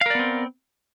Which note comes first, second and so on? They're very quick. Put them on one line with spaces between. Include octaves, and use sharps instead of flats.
F5 A#4 D5 B3 C4